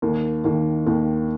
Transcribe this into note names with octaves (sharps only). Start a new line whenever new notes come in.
D#2 D#3 A#3
D#2 D#3 A#3
D#2 D#3 A#3